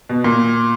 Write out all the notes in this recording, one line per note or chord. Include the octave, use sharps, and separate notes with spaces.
B2
A#2